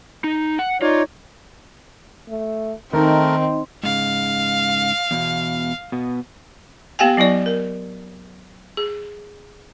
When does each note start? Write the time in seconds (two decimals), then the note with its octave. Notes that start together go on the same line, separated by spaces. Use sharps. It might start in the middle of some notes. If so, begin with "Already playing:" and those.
0.24 D#4
0.59 F#5
0.82 D#4 F4 C#5 D5
2.29 A3
2.93 D#3 A3 C4 D#4 A#4
3.83 G#2 C#3 F5
5.11 E2 B2
5.92 B2 B3
6.99 A#3 B3 G4 F5 G5 G#5
7.17 F#3 B3 E4 D5
7.46 A#4
8.77 G#4